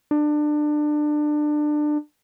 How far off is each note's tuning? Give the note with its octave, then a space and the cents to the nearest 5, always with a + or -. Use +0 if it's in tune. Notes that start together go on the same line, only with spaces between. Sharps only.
D4 +25